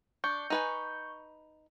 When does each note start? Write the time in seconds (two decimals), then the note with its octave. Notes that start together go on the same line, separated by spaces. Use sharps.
0.24 D4 C#6 G6
0.50 D#4 B4 G#5